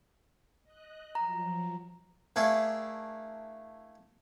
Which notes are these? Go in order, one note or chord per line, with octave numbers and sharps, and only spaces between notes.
D#5 F#6
F3 F#3 A#5
A3 A#3 D4 E4 G#4